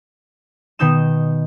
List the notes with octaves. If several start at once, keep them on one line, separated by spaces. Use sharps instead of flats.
B2 D#3 D#4 G6 E7